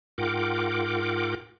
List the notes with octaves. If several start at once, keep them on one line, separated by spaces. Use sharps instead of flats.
G#2 F4 A#4 F#5 G5 D6